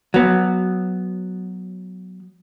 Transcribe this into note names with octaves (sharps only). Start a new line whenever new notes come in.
F#3 B3